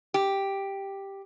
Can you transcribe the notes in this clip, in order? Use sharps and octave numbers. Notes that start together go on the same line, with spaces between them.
G4